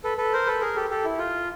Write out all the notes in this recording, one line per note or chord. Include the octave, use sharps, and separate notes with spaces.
A4 B4
A4 B4
A#4 C5
A4 B4
G#4 A#4
G4 A4
G4 A4
E4
F4